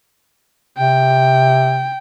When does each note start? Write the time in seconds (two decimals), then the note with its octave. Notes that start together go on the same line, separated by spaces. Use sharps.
0.78 C3 G5